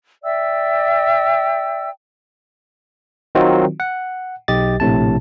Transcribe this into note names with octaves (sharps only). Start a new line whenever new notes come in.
D5 E5 G5 E6
D#3 F#3 C4 D#4 F4 F#4
F#5
B1 G4 D#5 A6
A#1 A2 C3 A5